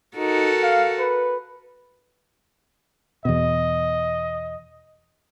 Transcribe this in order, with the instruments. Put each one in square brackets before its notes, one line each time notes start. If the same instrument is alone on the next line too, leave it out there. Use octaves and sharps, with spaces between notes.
[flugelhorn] D#4 [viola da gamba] F#4 A4 A#4
[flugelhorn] F5
B4
[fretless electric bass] E2 B2 [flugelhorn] D#5